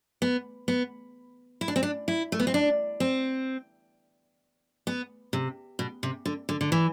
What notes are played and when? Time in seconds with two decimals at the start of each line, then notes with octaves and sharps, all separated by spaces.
0.22 B3
0.68 B3
1.61 E4
1.68 D4
1.76 C4
1.83 D4
2.08 E4
2.32 A3
2.40 B3
2.47 C4
2.54 D4
3.00 C4
4.87 B3
5.33 C3
5.79 B2
6.03 C3
6.26 D3
6.49 D3
6.61 D3
6.72 E3